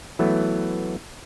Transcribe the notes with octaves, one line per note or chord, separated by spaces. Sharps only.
E3 F#3 A3 B3